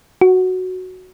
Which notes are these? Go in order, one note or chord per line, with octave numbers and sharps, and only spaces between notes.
F#4